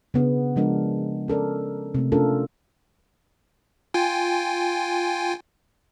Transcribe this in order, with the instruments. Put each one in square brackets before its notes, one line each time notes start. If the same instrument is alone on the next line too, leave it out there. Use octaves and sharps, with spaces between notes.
[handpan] C#3 B3 D4
F3 G#3 D4 A#4
C#4 A4 A#4 D5
C3 A3
A3 C#4 D4 F4 A4 A#4
[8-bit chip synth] F4 G5 G#5